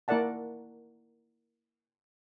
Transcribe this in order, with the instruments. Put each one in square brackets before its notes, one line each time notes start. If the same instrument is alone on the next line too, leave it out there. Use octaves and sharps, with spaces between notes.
[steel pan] A#3 E4 A#4 D5 F#5 A5